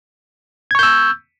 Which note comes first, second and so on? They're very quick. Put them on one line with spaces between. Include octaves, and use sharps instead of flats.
G#6 C#6 G6 E6